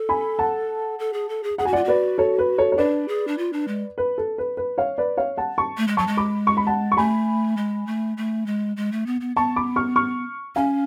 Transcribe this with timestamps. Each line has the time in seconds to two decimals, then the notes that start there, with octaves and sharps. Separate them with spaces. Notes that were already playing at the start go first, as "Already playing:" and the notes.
Already playing: A4
0.09 G#5 B5
0.39 F#5 A5
0.99 A4
1.13 G#4
1.29 A4
1.43 G#4
1.58 G#4 F#5
1.65 F#4 G#5
1.73 F4 D5 F#5
1.85 F#4 B4 D5
2.18 A4 C#5
2.39 B4
2.58 A4 C#5
2.72 C#5
2.78 D4 B4 D5
3.08 G#4
3.28 D4
3.38 F4
3.53 D4
3.68 G#3
3.98 B4
4.18 A4
4.38 B4
4.57 B4
4.78 C#5 F5
4.98 B4 D5
5.17 C#5 F5
5.37 F#5 A5
5.58 A5 C#6
5.77 A3
5.88 G#3
5.97 F#3 A5 C#6
6.07 G#3
6.17 B5 D6
6.47 C#6
6.57 B5
6.67 F#5 A5
6.92 C#6
6.97 A3 G#5 B5
7.57 G#3
7.87 A3
8.17 A3
8.46 G#3
8.77 G#3
8.92 A3
9.06 B3
9.21 B3
9.36 B3 A5 C#6
9.56 B5 D6
9.76 C#6 F6
9.96 C#6 F6
10.56 C#4 F5 G#5